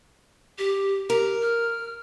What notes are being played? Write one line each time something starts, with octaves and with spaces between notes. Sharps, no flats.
G4
G4 A#4
F6